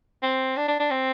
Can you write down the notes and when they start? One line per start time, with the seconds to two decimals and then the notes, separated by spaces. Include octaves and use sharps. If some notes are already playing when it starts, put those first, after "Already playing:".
0.23 C4
0.57 D4
0.68 D4
0.80 D4
0.91 C4